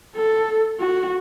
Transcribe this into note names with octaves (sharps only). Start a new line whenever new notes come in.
A4
F#4